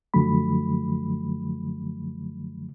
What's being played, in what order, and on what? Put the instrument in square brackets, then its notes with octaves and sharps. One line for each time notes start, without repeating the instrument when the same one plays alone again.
[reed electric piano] F#2 D3 F3 F#3 A3 B5